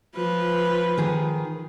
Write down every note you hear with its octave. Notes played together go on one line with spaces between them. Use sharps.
F3 B4
D#3 G#4